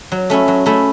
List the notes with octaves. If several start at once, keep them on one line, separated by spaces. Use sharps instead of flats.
F#3
A3 C#4 E4
F#3
A3 C#4 E4